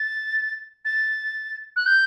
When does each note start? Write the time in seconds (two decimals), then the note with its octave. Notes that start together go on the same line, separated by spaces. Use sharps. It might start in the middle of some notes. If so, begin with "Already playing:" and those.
Already playing: A6
0.85 A6
1.76 F#6
1.86 G6